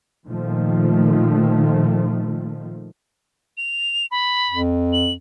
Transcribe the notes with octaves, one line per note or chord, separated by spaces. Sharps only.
A#2 D#3 F3 A3
F7
B5
F2
F#7